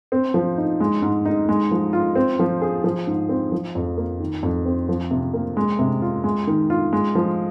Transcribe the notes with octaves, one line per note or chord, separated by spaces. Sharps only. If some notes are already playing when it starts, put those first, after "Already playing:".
C4
F3
D#4
G#3
G#2
D#4
G#3
F3
F4
C4
F3
G#4
F3
G#2
C4
F3
F2
A#3
D#3
F2
C4
F3
C3
A#3
G#3
C3
F4
G#3
D#3
F4
G#3
F3